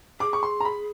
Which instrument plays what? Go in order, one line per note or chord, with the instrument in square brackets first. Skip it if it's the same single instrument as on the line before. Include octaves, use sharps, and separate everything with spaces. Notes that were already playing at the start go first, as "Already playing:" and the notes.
[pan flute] G#4 [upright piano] D6
[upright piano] C#6
C6
A#5
B5